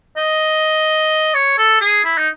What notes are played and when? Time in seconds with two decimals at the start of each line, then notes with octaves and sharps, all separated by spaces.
0.17 D#5
1.34 C#5
1.58 A4
1.81 G#4
2.05 E4
2.18 D#4